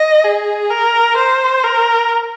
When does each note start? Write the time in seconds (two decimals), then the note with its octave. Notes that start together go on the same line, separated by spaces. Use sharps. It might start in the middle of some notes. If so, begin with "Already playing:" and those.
Already playing: D#5
0.24 G#4
0.71 A#4
1.17 C5
1.64 A#4